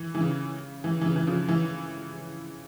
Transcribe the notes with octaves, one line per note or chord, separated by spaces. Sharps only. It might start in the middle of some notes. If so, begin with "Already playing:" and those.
Already playing: E3
E3
C#3
E3
E3
C#3
E3
C#3 F3
E3